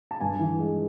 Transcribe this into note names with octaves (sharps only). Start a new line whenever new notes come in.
A5
G2 G#5
E3
G#3